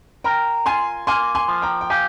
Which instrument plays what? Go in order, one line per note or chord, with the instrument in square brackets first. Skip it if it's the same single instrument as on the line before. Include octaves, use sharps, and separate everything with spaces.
[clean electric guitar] A#4 [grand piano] G5 A#5
[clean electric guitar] F4 [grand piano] G#5 C6
[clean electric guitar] A#3 [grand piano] G#5 C6
[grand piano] G#5 C6
[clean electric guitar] F3
[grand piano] G5 A#5
G5
[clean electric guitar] G4 [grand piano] F5 G#5